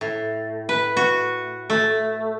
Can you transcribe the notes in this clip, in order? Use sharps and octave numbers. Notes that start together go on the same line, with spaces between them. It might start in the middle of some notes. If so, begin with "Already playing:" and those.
A2
B4
F#4
A3